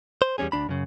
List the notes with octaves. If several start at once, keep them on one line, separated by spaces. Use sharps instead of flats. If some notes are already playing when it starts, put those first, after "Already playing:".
C5
E2 G3 C4 C#4 G#4
D2 D4 B5
F#2 C#3